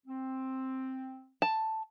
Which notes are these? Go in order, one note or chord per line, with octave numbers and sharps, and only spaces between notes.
C4
A5